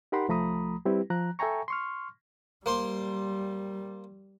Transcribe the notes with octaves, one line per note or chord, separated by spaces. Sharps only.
D#4 G4 A#4 F#5 B5 C6
C2 F3 A3 A#5 B5 D#6
G3 C4 E4 G4 B4
F3 A#5 F#6
A4 E5 G5 G#5 A#5 C#6
C6 C#6 F6
G3 A#3 C5 C6